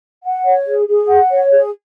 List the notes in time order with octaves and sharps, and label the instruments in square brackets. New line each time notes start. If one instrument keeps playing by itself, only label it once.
[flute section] F#5
C#5
G#4
G#4
F#5
C#5
G#4